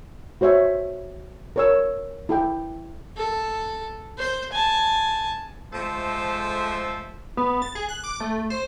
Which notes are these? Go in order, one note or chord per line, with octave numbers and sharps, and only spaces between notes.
F#4 C5 C#5 E5
A#4 C#5 E6
E4 A4 G5
A4
C5
G#5 A5
F3 G#3 A3 A4 C5 E5
B3
A6
G#4
F#6
D6
A3
C5